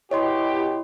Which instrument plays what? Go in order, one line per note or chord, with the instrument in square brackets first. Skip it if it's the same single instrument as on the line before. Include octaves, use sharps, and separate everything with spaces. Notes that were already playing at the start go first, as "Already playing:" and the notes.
[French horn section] B2 G4 [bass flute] E4 [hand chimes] C#5 D#5 C6